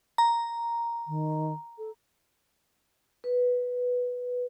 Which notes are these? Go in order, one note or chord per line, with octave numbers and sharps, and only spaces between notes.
A#5
D#3
A4
B4